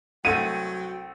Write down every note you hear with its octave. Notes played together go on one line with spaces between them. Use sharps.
C2 F#3 A3 F#5 G5 D#7